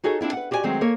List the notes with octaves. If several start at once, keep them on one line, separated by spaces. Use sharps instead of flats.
D#4 F#4 G#4 A4 C#5
C4 D4 E4 F4
B4 F#5
F#4 G4 D5 E5 G#5
D#3 F#3 G#3 A3 C4
A#3 A4 A#4 C#5